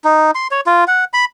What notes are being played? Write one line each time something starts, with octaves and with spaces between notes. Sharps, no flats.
D#4
C6
C#5
F4
F#5
B5